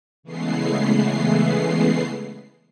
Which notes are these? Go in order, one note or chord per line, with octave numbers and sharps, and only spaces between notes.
C#3 E3 G#3 A3 B3 C7